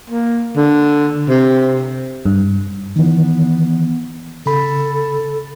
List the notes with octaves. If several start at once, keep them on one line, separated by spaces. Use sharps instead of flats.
A#3
D3
C3
G2
D#3 E3 B3
C#3 A4 B5